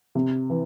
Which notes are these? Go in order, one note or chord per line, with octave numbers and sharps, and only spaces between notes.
C3
E3